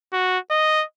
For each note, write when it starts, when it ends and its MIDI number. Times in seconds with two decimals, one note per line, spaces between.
0.13 0.38 66
0.51 0.84 75